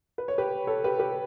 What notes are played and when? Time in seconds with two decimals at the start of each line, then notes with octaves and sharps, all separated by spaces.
0.18 B4
0.28 C#5
0.38 G4 B4
0.67 A4 C#5
0.84 G4 B4
1.00 G4 B4